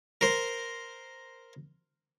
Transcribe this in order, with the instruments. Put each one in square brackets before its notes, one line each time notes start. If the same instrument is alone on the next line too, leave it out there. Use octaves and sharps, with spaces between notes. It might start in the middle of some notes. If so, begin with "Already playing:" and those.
[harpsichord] A#4 C5